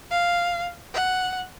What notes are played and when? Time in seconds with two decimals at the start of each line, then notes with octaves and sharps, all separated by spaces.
0.11 F5
0.94 F#5